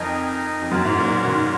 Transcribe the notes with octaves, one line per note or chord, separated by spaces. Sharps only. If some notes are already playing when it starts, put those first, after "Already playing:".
Already playing: F2 D#4 A#4 D#5 G#5
F2
F#2 F4 A#4 C#5 F#5
G#2
A#2
B2
D#3